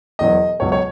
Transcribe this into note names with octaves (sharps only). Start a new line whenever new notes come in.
E1 E2 B2 F#3 D#5
C#2 B2 F#3 C#5
C#5